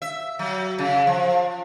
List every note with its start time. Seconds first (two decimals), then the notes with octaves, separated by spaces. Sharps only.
0.02 E5
0.39 F#3
0.79 C#3
1.07 F3